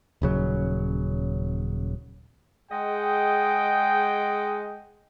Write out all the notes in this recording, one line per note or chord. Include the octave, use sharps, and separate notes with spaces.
D#1 C#3 F#3
G#3 G#4 D#5 F#5 G5